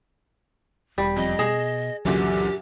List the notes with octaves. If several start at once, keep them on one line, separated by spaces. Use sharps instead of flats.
E1 G3
F2 D#5
B2 G#4 A#6 E7
C#2 F#2 A#2 D3 E3 F#3 G4